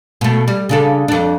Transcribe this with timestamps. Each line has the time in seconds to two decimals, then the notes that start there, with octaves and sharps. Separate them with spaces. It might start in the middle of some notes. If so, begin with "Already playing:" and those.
0.21 B2 A3
0.48 G3
0.69 C#3 D4 A4
1.08 F2 D4